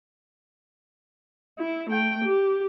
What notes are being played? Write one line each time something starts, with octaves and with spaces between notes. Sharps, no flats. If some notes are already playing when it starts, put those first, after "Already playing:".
E4
A3 G5
G4